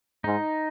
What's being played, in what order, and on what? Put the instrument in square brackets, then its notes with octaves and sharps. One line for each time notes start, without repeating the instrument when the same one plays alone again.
[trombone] G#2 [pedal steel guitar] D#4